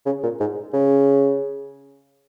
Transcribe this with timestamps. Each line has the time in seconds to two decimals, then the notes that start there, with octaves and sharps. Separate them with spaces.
0.06 C#3
0.23 A#2
0.40 G#2
0.73 C#3